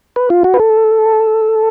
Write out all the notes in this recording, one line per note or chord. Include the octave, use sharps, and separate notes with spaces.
B4
F4
F#4
B4
A4